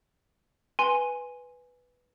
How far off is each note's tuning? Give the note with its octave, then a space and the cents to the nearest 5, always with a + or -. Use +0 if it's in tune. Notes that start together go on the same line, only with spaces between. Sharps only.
B4 +0 G#5 +0 C6 +5